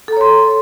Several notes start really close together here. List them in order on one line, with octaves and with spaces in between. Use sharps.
A4 A#5 C#5 C6